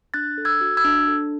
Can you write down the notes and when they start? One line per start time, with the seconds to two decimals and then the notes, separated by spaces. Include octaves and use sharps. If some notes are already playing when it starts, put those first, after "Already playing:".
0.14 D4 F#6 A6
0.38 A4
0.45 E6 G#6
0.61 F#4
0.77 E6 G#6
0.85 D4
1.08 A4